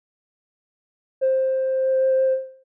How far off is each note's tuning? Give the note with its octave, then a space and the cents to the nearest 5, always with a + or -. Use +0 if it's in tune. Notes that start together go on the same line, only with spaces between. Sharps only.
C5 +10